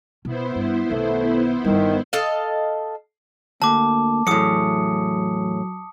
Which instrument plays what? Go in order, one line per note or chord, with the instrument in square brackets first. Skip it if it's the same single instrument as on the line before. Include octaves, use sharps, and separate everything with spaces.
[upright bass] B2 [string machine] B3 E4 C5
[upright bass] G2
[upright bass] B1 D#3 [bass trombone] A3
[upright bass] G1 G3 [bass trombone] D#3
[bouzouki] A4 D#5 F5
[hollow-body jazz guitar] D2 [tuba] A#3 [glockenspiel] A5 D6
[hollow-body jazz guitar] E2 A2 [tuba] F#3 [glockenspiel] D#6 C#7